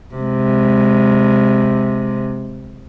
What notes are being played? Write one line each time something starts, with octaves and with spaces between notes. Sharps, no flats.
C3 G#3